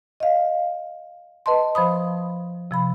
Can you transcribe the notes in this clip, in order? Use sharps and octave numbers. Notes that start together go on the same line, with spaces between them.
D#5 F5
B4 D#5 A5 C6
F3 C5 B5 D#6
C3 F3 B5